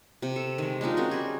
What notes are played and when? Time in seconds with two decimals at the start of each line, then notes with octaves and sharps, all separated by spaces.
0.22 C3
0.36 A4
0.58 D#3 G#3
0.81 G#3 D4 D#4 F4
0.97 C4 C#4 F#4 A#4
1.11 G3 G#4